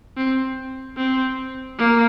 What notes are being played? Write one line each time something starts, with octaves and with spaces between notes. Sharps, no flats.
C4
C4
A#3